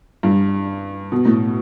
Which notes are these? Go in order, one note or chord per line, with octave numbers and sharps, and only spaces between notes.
G2
B2
A2